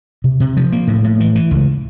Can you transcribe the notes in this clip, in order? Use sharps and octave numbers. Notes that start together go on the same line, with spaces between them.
C3
C3
F3
A#3
A2
A2
E3
E3
C#2